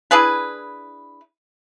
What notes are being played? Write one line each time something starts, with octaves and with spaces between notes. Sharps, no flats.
D4 E4 G#4 B4